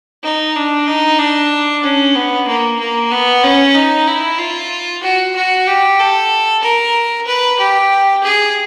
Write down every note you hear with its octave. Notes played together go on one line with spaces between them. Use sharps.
D#4
D4
D#4
D4
C#4
B3
A#3
A#3
B3
C#4
D#4
E4
F4
F#4
F#4
G4
A4
A#4
B4
G4
G#4